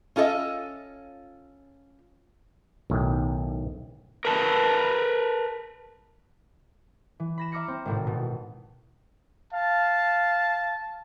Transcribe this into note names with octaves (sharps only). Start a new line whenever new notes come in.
C#4 F4 A4 D#5 E5
B1 A2 D#3
A#4 B4 A5
E3
B5 A#6 E7
E5 A#5 D6 F6 A#6 C#7
C4
G#1 A2 C3
B2
F5 A5